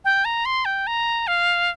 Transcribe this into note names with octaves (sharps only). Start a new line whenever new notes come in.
G5
A#5
C6
G5
A#5
F5